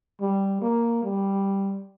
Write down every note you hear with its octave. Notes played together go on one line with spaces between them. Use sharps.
G3
A#3
G3